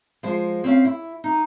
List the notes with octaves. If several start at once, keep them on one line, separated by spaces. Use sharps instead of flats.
F3 G#3 C5
C4 C#4 F5
E4
D#4